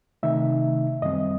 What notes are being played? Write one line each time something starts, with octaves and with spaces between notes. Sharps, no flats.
C3 D#3 A3 D#4 E5
F#2 D#3 G3 C4 D#5